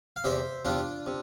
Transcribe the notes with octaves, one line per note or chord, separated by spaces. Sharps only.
F5
E2 C3 G3 C5 E5
E2 C3 G3 D4 F4
C3